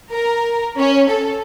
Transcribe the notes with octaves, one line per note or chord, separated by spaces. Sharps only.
A#4
C#4
A4